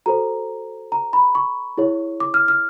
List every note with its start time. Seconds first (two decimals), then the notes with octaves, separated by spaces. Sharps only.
0.06 F#4 A4 C5 A#5
0.92 A#5
1.13 B5
1.35 C#6
1.77 E4 G#4 C#5
2.20 D6
2.34 F6
2.48 F6